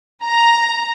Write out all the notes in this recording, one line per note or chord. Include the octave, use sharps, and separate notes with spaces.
A#5